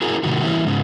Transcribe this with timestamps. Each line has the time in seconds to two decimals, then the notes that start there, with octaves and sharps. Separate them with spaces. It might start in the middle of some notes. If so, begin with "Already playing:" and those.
0.02 E4 F#4 G#4 A#4
0.23 A2 C3 D#3 F#4
0.42 E3 F3 G3 A#3 C#4 E4
0.66 G#2 C#3